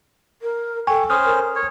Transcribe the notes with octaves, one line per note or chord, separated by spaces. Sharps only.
A#4
A4 G5 G#5 C#6
C#4 C5 D#6 F6
A#4
C#5